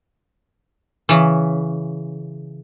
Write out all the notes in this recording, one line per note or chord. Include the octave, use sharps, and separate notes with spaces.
C#3 E3